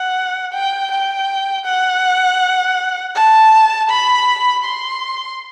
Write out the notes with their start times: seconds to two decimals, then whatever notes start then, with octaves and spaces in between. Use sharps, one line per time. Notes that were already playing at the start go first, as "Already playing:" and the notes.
Already playing: F#5
0.53 G5
0.91 G5
1.65 F#5
3.15 A5
3.89 B5
4.65 C6